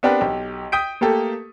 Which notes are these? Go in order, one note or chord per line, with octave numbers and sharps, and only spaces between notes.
B3 C4 D4 G4 A#4 B4
B1 G4
G5 D#6 G6 B6 D7
A3 A#3 G4 A4